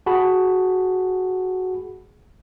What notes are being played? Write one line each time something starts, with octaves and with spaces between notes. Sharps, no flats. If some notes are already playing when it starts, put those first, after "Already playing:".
F#4 G#4 F#5 A5 B5